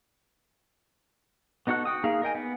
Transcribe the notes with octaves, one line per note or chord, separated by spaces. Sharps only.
B3 D#4 F#4 A4 F#6
F#4 G5 D#6
A#3 D#4 G#4 F5
A#4 D#5 G5 G#5
B3